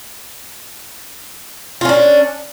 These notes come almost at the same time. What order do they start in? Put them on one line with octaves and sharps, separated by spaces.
F4 C#4 D4